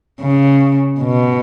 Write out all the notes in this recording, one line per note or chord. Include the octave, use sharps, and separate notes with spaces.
C#3
B2